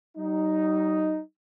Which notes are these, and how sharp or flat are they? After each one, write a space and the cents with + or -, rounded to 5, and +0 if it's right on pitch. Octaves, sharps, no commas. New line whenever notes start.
G3 -45 D#4 +0